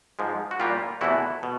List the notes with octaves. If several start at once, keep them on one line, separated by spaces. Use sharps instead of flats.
G#2 F3 G#3
F#4
A#2 G3 A#3 F4 G4
E2 C3 E3 A3 E4 F#4
B2